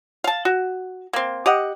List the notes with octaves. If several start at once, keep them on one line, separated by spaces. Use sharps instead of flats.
F5 A5
F#4
A#3 C4
G4 D#5 F#5